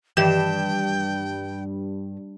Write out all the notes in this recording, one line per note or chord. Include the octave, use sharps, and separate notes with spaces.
G2 D#3 E3 G4 G5 E7